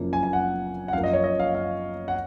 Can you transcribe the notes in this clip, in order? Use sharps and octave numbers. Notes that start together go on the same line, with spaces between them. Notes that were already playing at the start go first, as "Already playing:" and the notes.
Already playing: F#1 F#2 F3 A#3
G#5
G#5
F#5
F#5
F#2 F3 A#3 F5
D#5
C#5
D#5
F5
F5
F#5